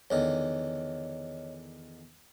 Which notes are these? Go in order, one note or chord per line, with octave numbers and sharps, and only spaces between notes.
E2 D3 D#3 C#5 D#5